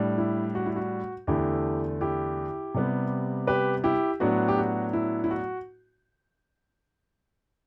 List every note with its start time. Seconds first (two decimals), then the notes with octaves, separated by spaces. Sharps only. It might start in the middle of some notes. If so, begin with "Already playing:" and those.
Already playing: A2 G3 D4
0.18 E4
0.55 F#4
0.66 E4
0.76 F#4
1.27 E2 D3 A3 E4 G4
2.01 E4 G4
2.74 C3 G3 B3
3.47 G4 B4
3.84 E4 G4
4.20 A2 F#3 B3 D4 F#4
4.48 G4
4.58 F#4
4.93 E4
5.24 E4
5.31 F#4